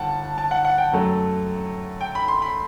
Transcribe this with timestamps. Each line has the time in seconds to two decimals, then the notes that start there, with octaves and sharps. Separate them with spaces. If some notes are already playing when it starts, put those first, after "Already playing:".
Already playing: G1 F#5 G5 A5
0.38 A5
0.51 F#5
0.65 F#5
0.78 G5
0.92 F#2 F#3 A3
2.01 G5
2.15 B5
2.28 C6
2.42 B5